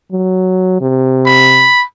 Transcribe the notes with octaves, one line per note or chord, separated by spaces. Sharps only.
F#3
C3
B5